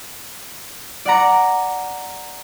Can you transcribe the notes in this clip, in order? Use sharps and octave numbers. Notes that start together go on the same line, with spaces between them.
D5 F#5 A#5